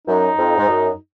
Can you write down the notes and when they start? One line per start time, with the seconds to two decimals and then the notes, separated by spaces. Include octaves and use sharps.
0.07 F#2 D#4
0.38 F2
0.57 G#2
0.68 F#2